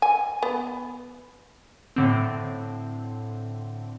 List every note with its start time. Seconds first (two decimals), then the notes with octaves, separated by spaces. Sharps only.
0.02 G#5
0.43 B3
1.96 A2 D3 C4